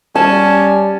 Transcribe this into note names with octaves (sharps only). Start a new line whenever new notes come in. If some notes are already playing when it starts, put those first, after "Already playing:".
G3 C#4 A5